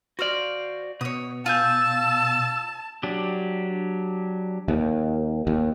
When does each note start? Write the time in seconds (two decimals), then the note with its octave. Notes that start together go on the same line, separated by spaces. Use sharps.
0.19 F#4 C5 D5 F5
1.01 B2 C#5 D#6
1.46 F4 G#5 A5 E6 G6
3.03 F#3 D4 G4
4.68 D#2
5.47 D#2